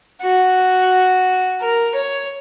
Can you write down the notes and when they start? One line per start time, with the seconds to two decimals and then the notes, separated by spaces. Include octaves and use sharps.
0.22 F#4
1.61 A#4
1.95 C#5